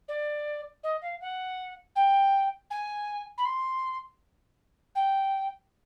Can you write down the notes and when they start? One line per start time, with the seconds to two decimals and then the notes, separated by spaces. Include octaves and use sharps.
0.08 D5
0.84 D#5
1.02 F5
1.21 F#5
1.96 G5
2.70 G#5
3.38 B5
3.45 C6
4.95 G5